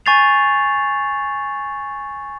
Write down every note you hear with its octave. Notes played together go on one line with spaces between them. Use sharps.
G#5 C#6 G6 A6 C7 F7